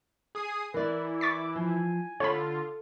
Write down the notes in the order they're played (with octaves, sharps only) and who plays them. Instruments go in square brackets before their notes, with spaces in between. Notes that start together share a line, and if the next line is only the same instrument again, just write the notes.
[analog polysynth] G#4 D#6 C7
[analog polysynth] E3 E4 [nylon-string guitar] A#4 D5 [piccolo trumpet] B4
[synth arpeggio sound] C#6 A6 B6 [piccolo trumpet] D6
[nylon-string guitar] F3 [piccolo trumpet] G#5
[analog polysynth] D3 F4 [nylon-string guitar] A4 [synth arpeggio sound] C#5 B5